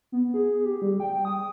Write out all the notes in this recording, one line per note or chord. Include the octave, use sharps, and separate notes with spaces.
B3
G#4
G4
G3
G5
D#6